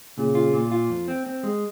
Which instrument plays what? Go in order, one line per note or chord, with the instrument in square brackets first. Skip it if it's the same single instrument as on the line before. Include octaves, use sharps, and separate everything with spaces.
[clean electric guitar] A#2 [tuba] C#3
[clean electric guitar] F4
A#2
F4
F2
C4
C4
G#3